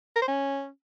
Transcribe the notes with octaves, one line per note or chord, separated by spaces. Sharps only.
A#4
C5
C#4